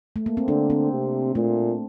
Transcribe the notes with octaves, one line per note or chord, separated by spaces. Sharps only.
A3
A#3
C4
D3 D4
C4
C3
A#2 A3